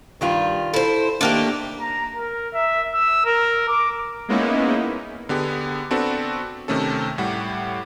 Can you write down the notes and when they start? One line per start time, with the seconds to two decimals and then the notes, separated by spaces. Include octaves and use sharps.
0.21 G2 D#3 G3 F4
0.74 E4 A4 C5
1.21 D#3 A3 A#3 D4 G4
1.81 A#5
2.16 A#4
2.54 E5
2.94 E6
3.25 A#4
3.68 D6
4.28 G#3 A#3 B3 C#4 D#4 E4
5.29 D3 B3 G4 G#4
5.91 B3 C4 D4 F#4 A4 B4
6.68 C3 D#3 A3 C#4 A4
7.18 A2 G3 G4 F#5